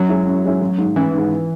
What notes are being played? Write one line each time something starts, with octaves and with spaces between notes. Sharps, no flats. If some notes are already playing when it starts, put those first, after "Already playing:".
Already playing: F#2 F#3
E3 G#3 C#4 E4
F#2
E3 G#3 C#4 E4
A1
G#2 D#3
A1 E3
G#2 D#3